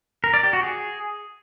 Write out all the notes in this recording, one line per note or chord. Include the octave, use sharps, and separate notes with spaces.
A#4
D5
G4
F#4
G#4